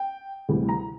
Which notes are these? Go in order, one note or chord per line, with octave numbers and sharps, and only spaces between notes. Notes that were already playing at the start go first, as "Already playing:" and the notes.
Already playing: G5
D2 C3 E3 G3
A#5